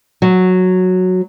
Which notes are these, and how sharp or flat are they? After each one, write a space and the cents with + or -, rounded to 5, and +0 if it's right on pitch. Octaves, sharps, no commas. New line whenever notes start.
F#3 -10